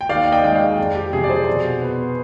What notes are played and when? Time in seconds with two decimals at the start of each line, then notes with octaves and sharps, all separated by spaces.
0.01 G5
0.09 D#2 D5 F5
0.32 D#5 G5
0.44 D#3 G#3 G5
0.55 D5 F5
0.78 F2
0.95 G4
1.13 C3 F3 G#4
1.24 D5
1.30 G#4 C5
1.47 B2
1.82 B3